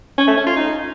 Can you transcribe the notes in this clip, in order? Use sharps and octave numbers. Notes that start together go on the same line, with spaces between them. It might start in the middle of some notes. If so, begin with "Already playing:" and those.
C#4
A3
C#4
F4
D#4